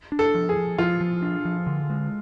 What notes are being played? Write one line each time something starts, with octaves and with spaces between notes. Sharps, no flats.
D4
A4
F3
G#4
F3
F3 F4
F3
D4
F3
D3
G#3